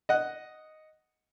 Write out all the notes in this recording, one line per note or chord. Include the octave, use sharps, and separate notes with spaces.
D#5 F#5